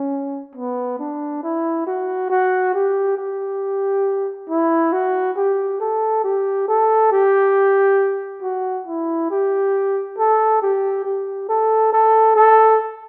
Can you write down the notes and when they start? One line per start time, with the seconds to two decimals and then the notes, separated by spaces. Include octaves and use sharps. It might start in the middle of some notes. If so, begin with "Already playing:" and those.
Already playing: C#4
0.55 B3
0.99 D4
1.43 E4
1.86 F#4
2.30 F#4
2.74 G4
3.18 G4
4.49 E4
4.92 F#4
5.37 G4
5.80 A4
6.24 G4
6.68 A4
7.12 G4
8.42 F#4
8.87 E4
9.31 G4
10.18 A4
10.62 G4
11.05 G4
11.49 A4
11.93 A4
12.36 A4